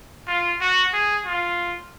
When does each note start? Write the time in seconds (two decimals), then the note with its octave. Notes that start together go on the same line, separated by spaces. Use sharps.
0.27 F4
0.61 F#4
0.93 G#4
1.26 F4